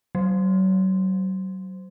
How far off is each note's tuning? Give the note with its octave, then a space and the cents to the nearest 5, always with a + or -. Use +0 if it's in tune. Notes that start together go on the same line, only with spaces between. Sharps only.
F#3 +35